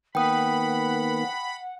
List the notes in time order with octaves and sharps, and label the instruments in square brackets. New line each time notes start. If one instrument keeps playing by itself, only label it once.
[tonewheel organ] D#3 A#3 B3 [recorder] F#5 [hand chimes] G5 D#6 [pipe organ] B5